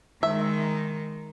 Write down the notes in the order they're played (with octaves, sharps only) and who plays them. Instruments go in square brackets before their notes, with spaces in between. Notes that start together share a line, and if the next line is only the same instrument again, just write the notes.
[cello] D#3 G#3 [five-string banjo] E5